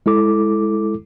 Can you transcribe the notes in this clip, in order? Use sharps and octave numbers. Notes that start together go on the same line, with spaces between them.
G#3 E4 A4 D6